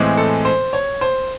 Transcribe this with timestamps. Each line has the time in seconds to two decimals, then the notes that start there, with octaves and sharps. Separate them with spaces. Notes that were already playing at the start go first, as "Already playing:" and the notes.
Already playing: A2 E3 G#3 C4
0.17 A4
0.45 C5
0.73 C#5
1.01 C5